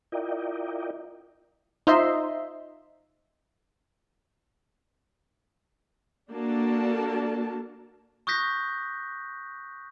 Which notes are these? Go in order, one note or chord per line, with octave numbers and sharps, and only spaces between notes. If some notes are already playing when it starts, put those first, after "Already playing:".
E4 F4 A#4 D5 D#5 G5
D#4 F4 C5 D#5 E5 C6
A#3 D4 F#4 A4 A#4 A5
C#6 D#6 F#6 G6 A#6 B6